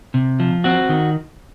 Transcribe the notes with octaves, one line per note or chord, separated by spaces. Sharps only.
C3
F3
C4 F#4
D#3